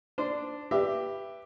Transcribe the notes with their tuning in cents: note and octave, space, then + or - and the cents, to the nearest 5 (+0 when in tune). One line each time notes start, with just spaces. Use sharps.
D4 +0 C5 -15
G4 +5 B4 +0 E5 +15